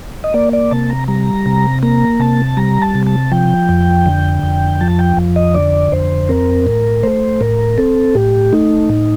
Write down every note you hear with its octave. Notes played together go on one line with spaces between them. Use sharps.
D#5
A#3 D5
D5
C3 A5
A#5
G3 A#5
C3
A#3 A#5
C3 A5
G3 A#5
A5
C3
A5
F3 G5
F2
D3
F2
F3 A5
G5
F2
D#5
D3 D5
F2 C5
C4 A#4
A2
A3 C5
A2 A#4
C4 A4
A2 G4
A3 D#4
A2